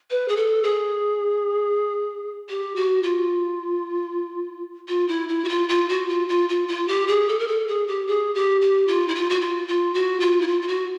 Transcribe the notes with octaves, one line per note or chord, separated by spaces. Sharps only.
B4
G#4
A4
G#4
G4
F#4
F4
F4
E4
E4
F#4
F4
F4
F#4
F4
F4
F4
F4
G4
G#4
A4
A#4
A4
G#4
G4
G#4
G4
G4
F4
E4
F4
F#4
F4
F4
F#4
F4
E4
F4
F4
F#4